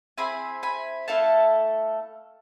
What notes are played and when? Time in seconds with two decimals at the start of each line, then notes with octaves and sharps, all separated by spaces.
0.18 C4 E4 G#4 G#5 B5
0.63 G#5 B5
1.08 A3 E4 A4 F5 A5